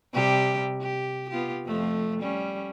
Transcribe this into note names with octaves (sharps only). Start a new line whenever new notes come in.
C3 G3 G4
G4
B3 F4 G4
F2 F3 A3
G3 C#4